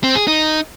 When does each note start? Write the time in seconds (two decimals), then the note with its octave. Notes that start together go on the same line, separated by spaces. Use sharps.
0.04 C4
0.16 G#4
0.28 D#4